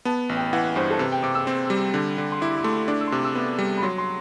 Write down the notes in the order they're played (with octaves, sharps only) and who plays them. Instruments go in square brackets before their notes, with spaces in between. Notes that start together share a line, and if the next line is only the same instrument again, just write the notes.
[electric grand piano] B3 [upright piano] A5
[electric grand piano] A1
[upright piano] G5
[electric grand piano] E3 [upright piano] F#5
[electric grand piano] G2 [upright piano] C5
[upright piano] A4
[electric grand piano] C3 [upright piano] B4
[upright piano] G5
[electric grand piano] C3 [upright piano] D6
[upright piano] E6
[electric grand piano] C4
G3
D3
D3
[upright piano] C6
[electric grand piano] E4 [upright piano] D6
[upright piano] D6
[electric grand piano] A3 [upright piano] C6
[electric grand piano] D4 [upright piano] D6
[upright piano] E6
C6
[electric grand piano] C3 [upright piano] D6
[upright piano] E6
[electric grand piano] B3 [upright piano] D6
[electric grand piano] G3
[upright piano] B5
[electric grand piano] F#3 [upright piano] C6
[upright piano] C6